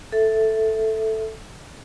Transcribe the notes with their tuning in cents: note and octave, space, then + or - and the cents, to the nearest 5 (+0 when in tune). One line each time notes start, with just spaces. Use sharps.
A4 +0 E5 +0